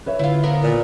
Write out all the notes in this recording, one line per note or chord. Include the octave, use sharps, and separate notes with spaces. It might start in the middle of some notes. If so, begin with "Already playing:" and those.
B4 C#5 E5
D3 E4 F4
B3 A#4
A#2